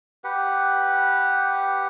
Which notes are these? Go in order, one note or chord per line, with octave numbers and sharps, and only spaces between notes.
G4 B4 F#5